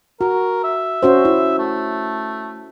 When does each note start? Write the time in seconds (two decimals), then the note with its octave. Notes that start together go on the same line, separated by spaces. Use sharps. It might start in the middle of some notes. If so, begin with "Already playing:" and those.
0.21 F#4 A#4
0.64 E5
1.03 C#4 F#4 C5
1.25 E4
1.59 A3